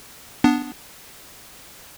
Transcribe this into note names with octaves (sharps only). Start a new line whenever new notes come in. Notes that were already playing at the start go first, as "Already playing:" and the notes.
B3 D4